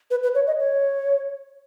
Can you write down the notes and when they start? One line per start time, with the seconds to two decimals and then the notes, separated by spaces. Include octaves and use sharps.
0.11 B4
0.23 B4
0.35 C#5
0.47 D#5
0.60 C#5